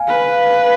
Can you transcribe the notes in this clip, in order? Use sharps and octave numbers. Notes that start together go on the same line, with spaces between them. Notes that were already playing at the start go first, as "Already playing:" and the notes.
Already playing: F5 G#5
B4